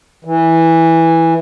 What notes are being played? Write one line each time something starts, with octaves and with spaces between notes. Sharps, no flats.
E3